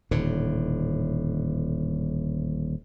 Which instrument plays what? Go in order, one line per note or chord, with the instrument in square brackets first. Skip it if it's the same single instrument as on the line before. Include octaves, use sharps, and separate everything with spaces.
[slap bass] D#1 A2 D3